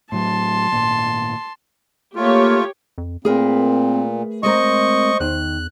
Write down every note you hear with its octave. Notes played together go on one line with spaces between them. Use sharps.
A2 F#3 A5 C6
G#1 A#2
A3 A#3 F4 G4 C#5
F2
A#2 A3 C4 G#4 A#4 B4
G#3 C4 A#4 C5 D#5 C#6
E2 D#3 F#6